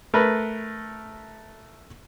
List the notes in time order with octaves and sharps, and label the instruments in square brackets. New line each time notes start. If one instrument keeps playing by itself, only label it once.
[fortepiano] A3 A#4 B4